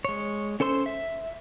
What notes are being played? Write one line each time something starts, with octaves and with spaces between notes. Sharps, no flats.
G#3 C#5
C#4 A4 C5 C6 E6
E5